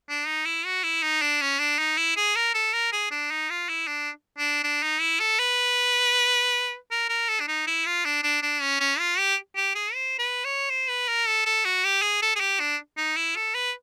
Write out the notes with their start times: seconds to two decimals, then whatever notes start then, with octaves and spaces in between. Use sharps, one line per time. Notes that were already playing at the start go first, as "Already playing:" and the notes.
0.09 D4
0.27 D#4
0.46 E4
0.65 F#4
0.84 E4
1.03 D#4
1.22 D4
1.42 C#4
1.59 D4
1.79 D#4
1.98 E4
2.17 G#4
2.36 A#4
2.54 A4
2.74 A#4
2.93 G#4
3.11 D4
3.31 D#4
3.50 F4
3.69 E4
3.87 D4
4.38 D4
4.64 D4
4.83 D#4
5.01 E4
5.20 A4
5.39 B4
6.91 A#4
7.09 A#4
7.29 A4
7.40 D4
7.48 D#4
7.67 E4
7.86 F4
8.05 D4
8.23 D4
8.43 D4
8.61 C#4
8.80 C#4
8.99 F4
9.19 G4
9.56 G4
9.75 G#4
9.94 C5
10.19 B4
10.45 C#5
10.70 C5
10.89 B4
11.08 A#4
11.27 A4
11.46 A4
11.65 F#4
11.84 G4
12.02 G#4
12.22 A4
12.36 G#4
12.40 G4
12.60 D4
12.98 D#4
13.17 E4
13.36 A4
13.55 B4